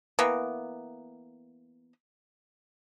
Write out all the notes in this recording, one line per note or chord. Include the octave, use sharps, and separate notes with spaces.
E3 A#3 B3